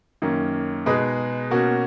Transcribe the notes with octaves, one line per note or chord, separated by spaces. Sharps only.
F#2 D#3 A#3 C#4
B2 G#3 D#4 G#4 B4
B2 A#3 C#4 F#4 A#4